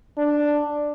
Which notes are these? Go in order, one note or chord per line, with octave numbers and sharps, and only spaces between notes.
D4